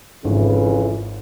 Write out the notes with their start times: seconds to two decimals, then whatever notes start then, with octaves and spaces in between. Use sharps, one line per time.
0.24 G#1 F2 C#3 E3